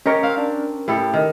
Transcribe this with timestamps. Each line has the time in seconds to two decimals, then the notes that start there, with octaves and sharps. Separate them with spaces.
0.06 C#4 G4 A#4 C#5 D#5 C#6
0.23 C4 F5
0.37 D4
0.88 A2 E4 G4 A4
1.14 D#3